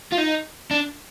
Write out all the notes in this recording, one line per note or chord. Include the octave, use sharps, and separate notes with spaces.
F4
D#4
D4